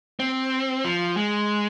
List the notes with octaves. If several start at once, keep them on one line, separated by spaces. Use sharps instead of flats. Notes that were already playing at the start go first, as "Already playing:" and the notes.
C4
F3
G#3